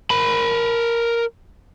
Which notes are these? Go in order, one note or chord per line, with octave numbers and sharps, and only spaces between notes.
A#4 B5